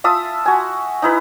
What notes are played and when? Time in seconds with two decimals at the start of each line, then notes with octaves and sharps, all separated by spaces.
0.04 F4 E5 A5 D#6
0.46 F#4 G#5
1.02 D#4 E4 B4